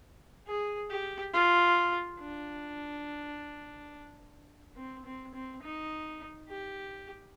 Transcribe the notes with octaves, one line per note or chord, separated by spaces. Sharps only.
G#4
G4
F4
D4
C4
C4
C4
D#4
G4